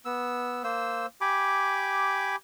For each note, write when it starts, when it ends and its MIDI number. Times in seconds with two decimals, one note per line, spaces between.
0.05 0.62 59
0.05 0.62 88
0.64 1.06 58
0.64 1.06 72
0.64 1.06 88
1.21 2.36 67
1.21 2.36 80
1.21 2.36 83
1.21 2.36 86